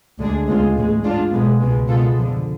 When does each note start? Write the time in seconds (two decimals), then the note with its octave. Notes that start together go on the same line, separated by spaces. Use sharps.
0.18 D2 D3 G#3 D4 G#4
0.47 D2 C#3 G#3 B3 F4
0.75 A1 A2 G#3
1.04 G#2 G#3 D4 F4
1.32 B1 B2 G#3 B3
1.60 C#2 B2 G#3
1.89 B2 G#3 B3 F4 A4
2.17 F2 D3 F3